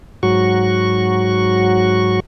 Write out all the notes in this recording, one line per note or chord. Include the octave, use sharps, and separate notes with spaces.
G#2 F#3 F#4 C#6